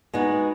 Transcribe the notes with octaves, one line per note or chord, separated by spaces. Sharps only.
G#3 B3 D#4 F#4